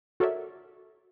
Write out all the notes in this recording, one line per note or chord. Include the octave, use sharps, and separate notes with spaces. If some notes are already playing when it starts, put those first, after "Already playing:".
F#4 A4 A#4 C#5 D5 E5